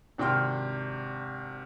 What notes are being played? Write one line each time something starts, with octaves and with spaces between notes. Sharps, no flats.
G#1 C3 D4 G5 C6 F6